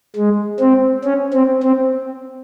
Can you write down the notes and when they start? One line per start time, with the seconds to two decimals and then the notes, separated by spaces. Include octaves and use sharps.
0.16 G#3
0.60 C4
1.04 C#4
1.33 C4
1.63 C4